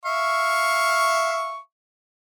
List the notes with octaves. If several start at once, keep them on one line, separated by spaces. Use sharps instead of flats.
E5 F5 C#6